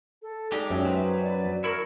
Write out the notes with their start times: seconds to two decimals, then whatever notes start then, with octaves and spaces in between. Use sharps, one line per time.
0.22 A4
0.52 G#3 D#4 G4 D5
0.70 F#2 C#4 E5
0.85 F#3 B4 C5
1.23 D5
1.64 E4 A#4 C#5 B5